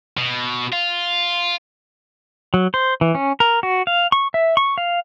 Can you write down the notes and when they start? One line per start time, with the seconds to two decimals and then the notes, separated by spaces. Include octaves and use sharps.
0.17 B2
0.73 F4
2.54 F#3
2.74 C5
3.01 E3
3.15 C#4
3.40 A#4
3.63 F#4
3.87 F5
4.12 C#6
4.34 E5
4.57 C#6
4.78 F5